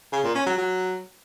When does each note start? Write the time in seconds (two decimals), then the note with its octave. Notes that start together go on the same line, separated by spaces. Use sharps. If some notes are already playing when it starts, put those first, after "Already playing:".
0.12 C#3
0.24 A#2
0.35 C#4
0.46 F#3
0.58 F#3